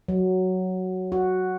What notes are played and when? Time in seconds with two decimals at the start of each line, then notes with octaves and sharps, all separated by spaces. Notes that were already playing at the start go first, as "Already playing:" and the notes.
0.08 F#3
1.12 F#4